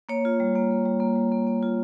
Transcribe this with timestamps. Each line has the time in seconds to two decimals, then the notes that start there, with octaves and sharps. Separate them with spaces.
0.09 A#3 C#5
0.25 F4
0.40 G3
0.55 A#3
0.71 A#3
0.85 G3
1.00 A#3
1.16 G3
1.32 A#3
1.47 A#3
1.63 F4